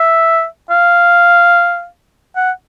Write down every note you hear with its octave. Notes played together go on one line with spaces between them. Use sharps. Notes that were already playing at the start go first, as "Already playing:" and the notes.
Already playing: E5
F5
F#5